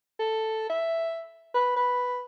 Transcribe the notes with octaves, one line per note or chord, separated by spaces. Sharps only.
A4
E5
B4
B4